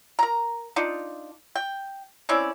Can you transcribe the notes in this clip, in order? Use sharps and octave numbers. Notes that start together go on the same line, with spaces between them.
A#4 A#5
D4 D#4 F4
G5
C4 C#4 E4 D5